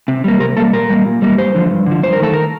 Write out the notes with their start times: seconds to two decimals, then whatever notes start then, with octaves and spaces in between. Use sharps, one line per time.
0.08 C3
0.24 G3 A#3
0.40 C3 A#4
0.57 G3 A#3 A4
0.73 A#2 A#4
0.90 G3 A#3
1.05 A#2
1.22 G3 A#3
1.38 G2 C5
1.55 D3 F3
1.71 G2
1.86 D3 F3
2.03 G2 C5
2.13 A#4
2.20 D#3 A3 A4
2.33 A#4